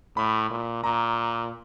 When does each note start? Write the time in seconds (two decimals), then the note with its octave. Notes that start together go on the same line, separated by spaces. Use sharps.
0.16 A2 B5
0.51 A#2
0.84 A#2 A#5